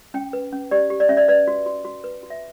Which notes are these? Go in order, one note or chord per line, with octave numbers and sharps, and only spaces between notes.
C#4 G5
B4
C#4
G4 D5
G4
D5
C#4 E5
D5
B4 D5
F#4
F#4
F#4
B4
F#4
E5